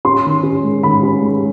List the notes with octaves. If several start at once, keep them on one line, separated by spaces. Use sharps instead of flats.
C#4 C6
D#3
C#4
G#3
D#3 B5
C#4
G#3